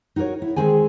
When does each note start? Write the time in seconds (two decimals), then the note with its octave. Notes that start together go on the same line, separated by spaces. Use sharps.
0.16 D#4 F#4 G4 A#4 C#5
0.42 E4
0.56 D#3 G#3 C4 G#4 G#5